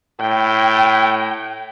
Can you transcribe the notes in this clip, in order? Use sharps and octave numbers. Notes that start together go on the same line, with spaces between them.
A2 G5